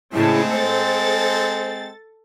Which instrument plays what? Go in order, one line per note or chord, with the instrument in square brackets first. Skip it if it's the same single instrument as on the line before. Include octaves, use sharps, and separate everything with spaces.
[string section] A2 C#3 A5 [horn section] G#3 C4 [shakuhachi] E4
[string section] A4 A6 [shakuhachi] C5